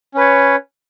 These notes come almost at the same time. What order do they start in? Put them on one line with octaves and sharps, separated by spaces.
C#4 B4 C#5